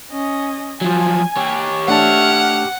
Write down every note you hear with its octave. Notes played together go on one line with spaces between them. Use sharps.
C#4 D#5
F3 F#3 G#5
G4 C#5
A3 D4 E5 F#5 A5 F6